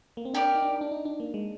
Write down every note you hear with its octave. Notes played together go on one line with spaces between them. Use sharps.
A#3
C4
D4 G4 A#4 D5
D#4
D4
D4
D#4
D4
A#3
G#3